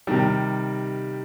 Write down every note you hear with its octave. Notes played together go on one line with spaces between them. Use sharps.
C3 D#3 G3